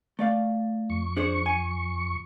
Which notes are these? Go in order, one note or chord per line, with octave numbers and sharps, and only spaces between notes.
A3 D5 F5
F2 C#6
D4 G#4 C5
G#5